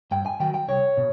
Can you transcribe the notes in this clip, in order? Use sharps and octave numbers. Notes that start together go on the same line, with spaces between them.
G2 G5
G#5
D#3 F#3 G5
G5
C2 C#5
B2